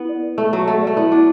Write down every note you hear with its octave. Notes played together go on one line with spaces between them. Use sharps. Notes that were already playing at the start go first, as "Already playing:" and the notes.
Already playing: B3 E4
D5
B4
A3 B4
F#3 A5
A3 A4
A3 D5
B3 E4
D4 E4